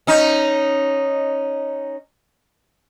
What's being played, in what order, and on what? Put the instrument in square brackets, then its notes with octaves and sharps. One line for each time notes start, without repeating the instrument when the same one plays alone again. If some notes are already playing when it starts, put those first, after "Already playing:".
[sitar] C#4 D#4